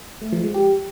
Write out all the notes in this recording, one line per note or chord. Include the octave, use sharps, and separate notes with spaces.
A3
F3
G#3
G4